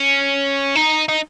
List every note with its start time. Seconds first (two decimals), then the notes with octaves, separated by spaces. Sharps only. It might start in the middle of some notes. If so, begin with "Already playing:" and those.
Already playing: C#4
0.75 D#4
1.08 D#4